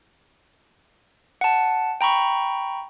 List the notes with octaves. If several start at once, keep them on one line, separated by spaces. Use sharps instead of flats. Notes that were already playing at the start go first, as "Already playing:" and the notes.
F#5 A5
G5 A#5 B5 C#6